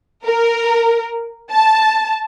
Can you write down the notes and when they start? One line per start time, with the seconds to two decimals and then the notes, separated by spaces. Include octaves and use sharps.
0.25 A#4
1.51 A5